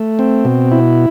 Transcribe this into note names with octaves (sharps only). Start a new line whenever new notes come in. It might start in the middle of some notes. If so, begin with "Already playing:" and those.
Already playing: A3
C4
B2
E4